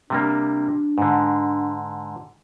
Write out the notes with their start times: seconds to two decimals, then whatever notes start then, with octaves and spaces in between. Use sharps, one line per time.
0.10 C3 G3 A#3 D4
0.98 G#2 D3